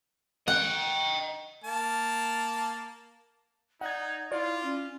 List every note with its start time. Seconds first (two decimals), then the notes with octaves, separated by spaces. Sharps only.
0.48 D#5 F#5 G5
1.64 A#3 A5
3.81 D#4 D5 F#5 G#6
4.32 E4 F4 D5
4.63 C#4